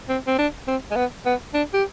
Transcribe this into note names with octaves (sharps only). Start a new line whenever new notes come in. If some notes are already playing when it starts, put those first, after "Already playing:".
C4
C4
D4
C4
G#3
B3
B3
D4
G4